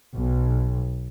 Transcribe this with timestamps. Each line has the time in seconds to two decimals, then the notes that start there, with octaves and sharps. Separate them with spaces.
0.14 B1